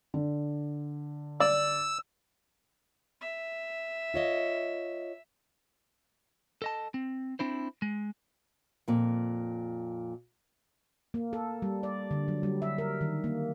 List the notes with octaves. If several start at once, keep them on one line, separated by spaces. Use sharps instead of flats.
D3
D5 E6
E5
F4 C#5 D#5
A4 D#5 A5
C4
C4 D4 E4 C5
G#3
F2 A#2
A#3
A4
G3
D5
D3
F#3
G3
E5
A#4
D#3
A#3